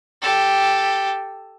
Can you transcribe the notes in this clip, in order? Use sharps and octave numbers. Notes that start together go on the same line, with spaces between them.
G4 A4